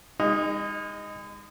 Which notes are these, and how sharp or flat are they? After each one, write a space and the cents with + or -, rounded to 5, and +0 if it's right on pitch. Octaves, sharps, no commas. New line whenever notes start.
G#3 -40 D#4 +0